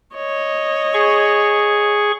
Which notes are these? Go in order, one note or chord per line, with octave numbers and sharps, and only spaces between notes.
C#5 D#5
G#4 C#6